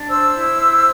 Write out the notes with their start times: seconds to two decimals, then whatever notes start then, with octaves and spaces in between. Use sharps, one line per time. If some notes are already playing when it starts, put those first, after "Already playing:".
Already playing: D4
0.09 C5 E6
0.34 E4
0.59 C5